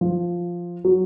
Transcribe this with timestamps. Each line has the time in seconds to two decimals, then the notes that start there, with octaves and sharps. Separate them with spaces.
0.01 F3
0.85 F#3